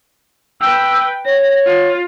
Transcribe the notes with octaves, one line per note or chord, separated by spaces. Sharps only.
B4 G5 E6
C#5 A#6
F4